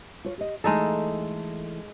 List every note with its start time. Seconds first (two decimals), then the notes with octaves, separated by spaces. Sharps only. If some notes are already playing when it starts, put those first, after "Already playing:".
0.25 F4 C#5
0.38 G4 D#5
0.64 E3 G#3 A3 D#4 A4